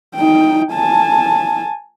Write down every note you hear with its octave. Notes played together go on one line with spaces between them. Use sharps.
D#4 G5
G#5 A5